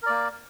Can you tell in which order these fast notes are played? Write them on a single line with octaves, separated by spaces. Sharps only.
A#4 D5 A#3